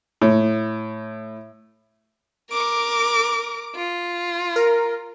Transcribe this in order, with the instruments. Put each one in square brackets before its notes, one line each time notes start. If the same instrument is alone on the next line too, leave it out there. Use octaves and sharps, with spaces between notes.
[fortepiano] A2
[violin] A#4 D6 [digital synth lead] D7
[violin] F4
[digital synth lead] A#4